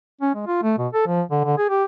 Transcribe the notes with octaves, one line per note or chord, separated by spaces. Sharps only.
C#4
G#3
F4
A3
B2
A4
F3
D3
D3
G#4
G4